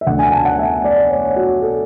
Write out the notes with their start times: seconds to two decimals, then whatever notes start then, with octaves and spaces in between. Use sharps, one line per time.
0.01 E5
0.07 D2 D3 F#5
0.19 G#5
0.33 A5
0.45 F#5
0.59 E5
0.84 D5
1.11 C#5
1.36 F#4
1.62 A4